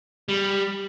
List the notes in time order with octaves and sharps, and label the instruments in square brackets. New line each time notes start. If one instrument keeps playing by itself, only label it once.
[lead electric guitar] G3